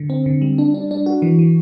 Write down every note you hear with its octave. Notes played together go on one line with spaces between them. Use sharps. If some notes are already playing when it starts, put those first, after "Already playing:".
Already playing: D3
C4
D3
G3
D4
D4
D4
F#4
E3
E3